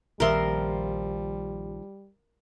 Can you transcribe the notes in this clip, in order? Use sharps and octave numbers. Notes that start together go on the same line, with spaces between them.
A#1 D#2 D#3 F3 G3 A#4 E5 C6